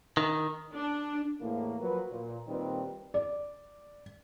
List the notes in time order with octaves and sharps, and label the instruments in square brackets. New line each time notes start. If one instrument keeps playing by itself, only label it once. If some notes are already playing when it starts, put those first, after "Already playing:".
[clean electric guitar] D#3
[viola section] D4
[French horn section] E2 A2 A#3
F3 F#3 A#4 B4
A#2
A#2 D#3 G3 C4 B4
[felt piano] D5